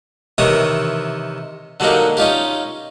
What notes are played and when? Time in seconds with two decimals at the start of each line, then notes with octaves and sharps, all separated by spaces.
0.38 C3 D#3 E3 C#5 D#6
1.80 D3 F#3 G3 A#3 D#4
2.17 C#4 D#4 F4 G4